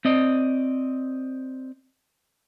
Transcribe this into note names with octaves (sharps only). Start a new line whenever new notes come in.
C4 D5 D#5